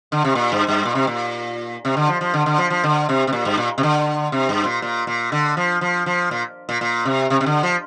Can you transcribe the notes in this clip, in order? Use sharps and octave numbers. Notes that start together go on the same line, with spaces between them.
D3
C3
A#2
G2
G2
A#2
C3
A#2
C3
D3
F3
F3
D3
D3
F3
F3
D3
C3
C3
A#2
G2
A#2
C3
D3
C3
G2
A#2
A#2
A#2
D3
F3
F3
F3
A#2
A#2
A#2
C3
C3
C3
D3
F3